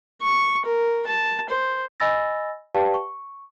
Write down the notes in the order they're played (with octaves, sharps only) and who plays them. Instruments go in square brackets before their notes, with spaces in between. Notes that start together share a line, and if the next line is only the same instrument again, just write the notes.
[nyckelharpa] C#6
A#4
A5
C5
[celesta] D#5 G#5 B5 E6 A6 A#6
G4 B4 D5 F5 G5 A5
C#6